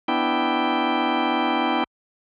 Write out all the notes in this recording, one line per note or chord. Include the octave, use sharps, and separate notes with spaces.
B3 D4 E4 G5